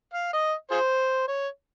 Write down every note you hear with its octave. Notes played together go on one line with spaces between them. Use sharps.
F5
D#5
F4 G#4 C5
C#5